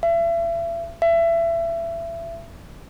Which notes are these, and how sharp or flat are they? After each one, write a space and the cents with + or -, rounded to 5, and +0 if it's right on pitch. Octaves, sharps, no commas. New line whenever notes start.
E5 +35
E5 +25